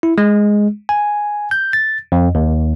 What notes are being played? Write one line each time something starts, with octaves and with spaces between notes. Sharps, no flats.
E4
G#3
G#5
G6
A6
F2
D#2